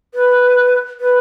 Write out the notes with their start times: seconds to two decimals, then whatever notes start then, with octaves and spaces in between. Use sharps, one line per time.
0.14 B4
1.00 B4